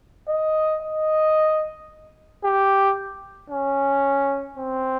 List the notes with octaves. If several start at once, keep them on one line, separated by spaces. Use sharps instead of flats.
D#5
D#5
G4
C#4
C4